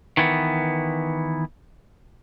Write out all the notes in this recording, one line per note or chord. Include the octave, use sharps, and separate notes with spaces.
D#3 E3 B3